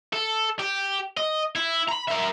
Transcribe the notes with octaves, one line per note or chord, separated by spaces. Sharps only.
A4
G4
D#5
E4
A#5 B5
A#4 E5